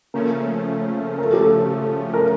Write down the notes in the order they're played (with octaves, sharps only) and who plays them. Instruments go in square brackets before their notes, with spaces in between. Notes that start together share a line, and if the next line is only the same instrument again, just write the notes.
[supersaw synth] C#3 F3 A3 C#4 [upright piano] A#3
[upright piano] A#4
A4
G4
A4
A#4